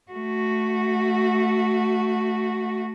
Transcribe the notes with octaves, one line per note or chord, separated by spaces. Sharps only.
A3 F#4